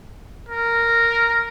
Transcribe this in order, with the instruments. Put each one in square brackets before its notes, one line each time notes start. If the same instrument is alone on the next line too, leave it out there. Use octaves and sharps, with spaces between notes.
[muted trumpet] A#4